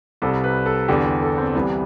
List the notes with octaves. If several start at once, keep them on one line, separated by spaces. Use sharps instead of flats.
C2 C3 G3 A4
B4
A4
E2 D3 G3 G4
G4
A4
C4
C2 C3 E3 G3 B3